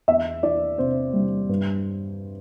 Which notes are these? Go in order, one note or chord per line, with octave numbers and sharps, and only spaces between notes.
E2 E5
E3 D5
C3 C5
G3
G2